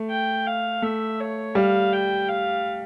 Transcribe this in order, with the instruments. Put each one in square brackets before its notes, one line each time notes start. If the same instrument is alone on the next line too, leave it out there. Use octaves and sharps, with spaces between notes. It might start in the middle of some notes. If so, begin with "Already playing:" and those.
Already playing: [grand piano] A3
[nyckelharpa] G5
F5
[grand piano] A3 [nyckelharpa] E5
[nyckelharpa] C#5
[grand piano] G3 [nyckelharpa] F5
[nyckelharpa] G5
F5